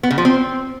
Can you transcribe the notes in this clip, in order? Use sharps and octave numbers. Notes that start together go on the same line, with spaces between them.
B3
C#3
F3
C4